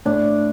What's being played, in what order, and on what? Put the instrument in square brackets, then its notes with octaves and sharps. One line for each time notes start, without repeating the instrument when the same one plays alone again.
[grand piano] A2 [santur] D4